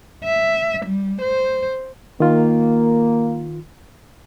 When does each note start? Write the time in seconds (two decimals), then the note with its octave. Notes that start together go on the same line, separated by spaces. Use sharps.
0.24 E5
0.85 G3
1.21 C5
2.20 D#3 A#3 F4